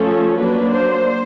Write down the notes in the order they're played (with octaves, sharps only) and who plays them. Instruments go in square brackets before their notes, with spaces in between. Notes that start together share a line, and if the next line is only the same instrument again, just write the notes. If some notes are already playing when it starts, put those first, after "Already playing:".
Already playing: [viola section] F3 A3 C#4 A4
F#3 A#3 D4 B4
C5